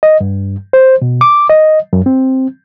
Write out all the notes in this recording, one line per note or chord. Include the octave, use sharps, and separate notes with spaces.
D#5
G2
C5
B2
D6
D#5
F#2
C4